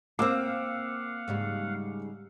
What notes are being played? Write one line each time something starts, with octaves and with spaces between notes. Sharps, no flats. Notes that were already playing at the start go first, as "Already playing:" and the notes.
A#3 C4 F5 F#5 D6 E6
G#2 C#3 G3